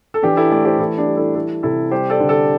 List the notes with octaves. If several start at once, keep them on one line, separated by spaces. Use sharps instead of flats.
A4
E3 D4 G4
E4 A4
A3 A4 D5
G4 C5
E3 E4 A4
D4 G4
G3
E4 A4
G3 E4 A4
C3 E4 A4
G3 G4 C5
A4 D5
D3
A4 D5